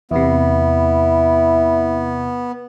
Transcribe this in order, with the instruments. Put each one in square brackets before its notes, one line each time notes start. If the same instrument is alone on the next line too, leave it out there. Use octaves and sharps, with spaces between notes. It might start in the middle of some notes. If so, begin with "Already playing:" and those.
[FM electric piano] E2 C3 [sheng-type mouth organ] B3 [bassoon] E4